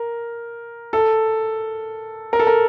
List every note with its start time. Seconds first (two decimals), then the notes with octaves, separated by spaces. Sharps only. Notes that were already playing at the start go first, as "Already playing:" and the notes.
Already playing: A#4
0.93 A4
2.33 A#4
2.39 A4
2.47 A#4